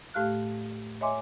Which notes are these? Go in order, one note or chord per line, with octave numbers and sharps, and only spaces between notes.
A2 A3 G4 F5 F6 F#6
C#5 D#5 E5 G#5 C6 D6